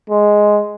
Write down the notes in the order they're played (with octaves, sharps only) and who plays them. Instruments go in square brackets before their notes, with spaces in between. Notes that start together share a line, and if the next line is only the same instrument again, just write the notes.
[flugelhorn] G#3